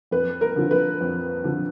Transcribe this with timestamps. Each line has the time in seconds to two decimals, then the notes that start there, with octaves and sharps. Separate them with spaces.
0.11 F2 B4
0.41 A#4
0.56 D3 F3
0.71 B4
1.01 F2
1.44 D3 F3